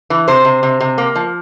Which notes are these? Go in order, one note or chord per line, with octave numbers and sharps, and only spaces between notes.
E3
C3 C5
C3
C3
C3
A#3
F3